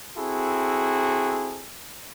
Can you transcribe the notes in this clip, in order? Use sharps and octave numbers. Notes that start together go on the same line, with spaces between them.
C4 E4 F#4 G#4 A4